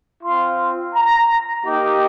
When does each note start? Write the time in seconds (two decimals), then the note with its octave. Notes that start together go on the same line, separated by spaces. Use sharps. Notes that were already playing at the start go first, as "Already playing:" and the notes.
0.24 C4 F4 C6
0.95 A#5
1.66 A#3 D#4 G4